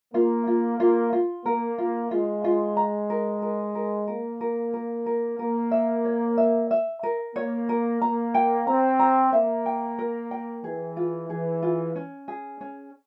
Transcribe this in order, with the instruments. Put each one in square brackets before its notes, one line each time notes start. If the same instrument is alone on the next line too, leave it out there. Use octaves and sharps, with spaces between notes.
[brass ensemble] A#3 [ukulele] F4
[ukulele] F4
[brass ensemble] A#3 [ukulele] F4
[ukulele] F4
[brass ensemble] A#3 [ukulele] A#4
[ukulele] F4
[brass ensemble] G#3 [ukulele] F4
[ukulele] F4
A#5
A#4
A#4
A#4
[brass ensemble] A#3 [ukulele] A#4
[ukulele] A#4
A#4
A#4
[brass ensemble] A#3 [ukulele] A#4
[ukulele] E5
C#5
E5
E5
A#4
[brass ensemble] A#3 [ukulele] C#5
[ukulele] A#4
[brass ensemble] A#3 [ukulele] A#5
[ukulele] G5
[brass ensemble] C4 [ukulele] A#5
[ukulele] A#5
[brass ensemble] A#3 [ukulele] E5
[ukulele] G5
A#4
G5
[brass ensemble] E3 [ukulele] G#4
[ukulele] F4
[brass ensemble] E3 [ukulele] G#4
[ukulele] F4
C#4
G#4
C#4